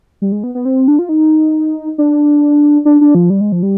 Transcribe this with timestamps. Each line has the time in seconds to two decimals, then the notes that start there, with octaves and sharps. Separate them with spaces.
0.22 G3
0.32 G#3
0.44 B3
0.55 B3
0.65 C4
0.88 D4
0.99 F4
1.09 D#4
1.98 D4
2.85 D4
3.01 D4
3.15 F3
3.30 G3
3.41 G#3
3.52 F3
3.63 G3